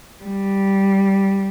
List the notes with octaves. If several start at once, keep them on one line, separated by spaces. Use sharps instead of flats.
G3